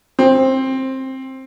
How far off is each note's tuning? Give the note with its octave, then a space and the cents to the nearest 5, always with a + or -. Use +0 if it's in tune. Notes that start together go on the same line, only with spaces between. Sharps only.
C4 +15